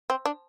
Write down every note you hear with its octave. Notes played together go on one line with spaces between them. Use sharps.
C4
D4